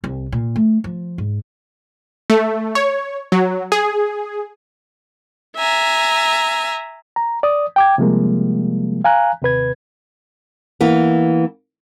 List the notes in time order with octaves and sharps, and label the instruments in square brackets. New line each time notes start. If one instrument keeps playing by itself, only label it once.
[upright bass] C2
A#2
A3
F3
G#2
[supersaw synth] A3
C#5
F#3
G#4
[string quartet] E5 G#5 A#5
[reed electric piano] A#5
D5 D#6
G5 D6 G#6
C3 F3 G3 G#3 A#3
F5 G#5 A#5 F#6
D#2 C3 B4 G#6
[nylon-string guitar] E3 A#3 B3